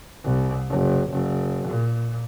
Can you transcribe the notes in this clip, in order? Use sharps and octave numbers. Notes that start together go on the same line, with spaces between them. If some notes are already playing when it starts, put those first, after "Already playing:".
C2
F#1
F#1
A#2